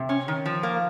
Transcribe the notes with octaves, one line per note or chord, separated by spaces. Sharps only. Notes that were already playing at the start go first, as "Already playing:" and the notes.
Already playing: C3
C#4
D#3
F3
A#3